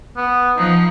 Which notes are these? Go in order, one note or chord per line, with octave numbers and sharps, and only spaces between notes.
B3
F3 D#4